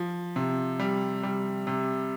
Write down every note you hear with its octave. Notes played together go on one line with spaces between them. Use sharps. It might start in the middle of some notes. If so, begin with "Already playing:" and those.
Already playing: F3
C3
G3
G3
C3